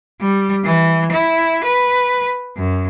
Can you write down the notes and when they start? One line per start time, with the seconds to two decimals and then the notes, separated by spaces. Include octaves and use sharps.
0.21 G3
0.65 E3
1.12 E4
1.64 B4
2.57 F#2